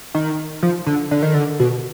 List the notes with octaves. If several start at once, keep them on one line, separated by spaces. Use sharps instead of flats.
D#3
F3
D3
D3
D#3
D3
B2